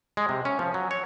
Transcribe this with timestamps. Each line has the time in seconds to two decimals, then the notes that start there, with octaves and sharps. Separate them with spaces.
0.17 G#3
0.29 C3
0.45 C#4
0.59 F3
0.74 F#3
0.91 C#5